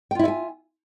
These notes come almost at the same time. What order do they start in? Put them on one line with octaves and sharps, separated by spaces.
G5 F4 E4 E5 G#5